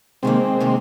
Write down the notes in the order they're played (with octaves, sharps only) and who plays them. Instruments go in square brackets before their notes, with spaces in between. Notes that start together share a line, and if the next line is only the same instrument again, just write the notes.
[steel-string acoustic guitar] C3 D#3 A#3 [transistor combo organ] G#3 C4
[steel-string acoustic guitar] C3 D#3 A#3